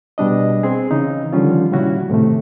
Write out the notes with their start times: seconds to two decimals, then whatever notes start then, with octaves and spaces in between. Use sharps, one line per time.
0.18 B2 G3 D4 D#5
0.63 C4 G#4
0.91 C#3 E3 D#4
1.32 D3 D#3 F3 G3 C#4 F4
1.72 A#2 C#3 G3 C#4 E4 F#4
2.10 A2 C3 D#3 A3